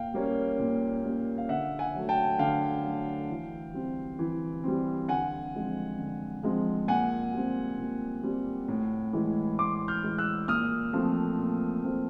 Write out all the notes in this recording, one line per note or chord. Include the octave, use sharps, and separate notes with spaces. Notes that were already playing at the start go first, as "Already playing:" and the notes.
Already playing: A#2 F5 G5
G3 A#3 C#4
A#2
G3 A#3 C#4
F5
D3 E5 F#5
F#5 G#5
F#3 A3
G5 A5
D3 F5 G5
F#3 A3
E3
G3 C4
E3
G3 C4
D3 F#5 G#5
F3 G#3 C4
D3
F3 G#3 C4
A#2 F#5 G#5
G3 C4
A#2
G3 C4
A2
E3 G#3
A2 C6 D6
F6 G6
E3 G#3
E6 F#6
A#2 D#6 F6
F3 A3 C4
A#2
F3 A3 C4